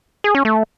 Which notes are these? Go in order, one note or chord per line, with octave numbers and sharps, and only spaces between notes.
G#4
C#4
A3